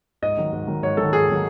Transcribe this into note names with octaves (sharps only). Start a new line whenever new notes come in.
G#2 D#5
D#3 F#3
G#2
D#3 F#3
G#2 C#5
D#3 F#3 A4
G#2 G#4
D#3 F#3